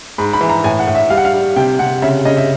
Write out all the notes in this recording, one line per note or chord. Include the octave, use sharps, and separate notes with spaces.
G#2 B5
B5
E3
A#5
A2 G#5
F#5
A2
E5
G3 F5
F#5
F5
G3
C3 G5
C3 F#5
C#3 E5
C#3 D#5
E5